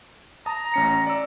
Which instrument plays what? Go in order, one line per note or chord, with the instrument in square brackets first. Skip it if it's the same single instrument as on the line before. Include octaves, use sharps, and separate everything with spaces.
[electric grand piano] A5 D#6 [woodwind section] A#5
[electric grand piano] A1 C#4 C#7
D5 E6